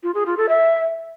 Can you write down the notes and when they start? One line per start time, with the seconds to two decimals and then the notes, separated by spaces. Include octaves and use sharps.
0.03 F4
0.15 G#4
0.26 F4
0.37 A4
0.49 E5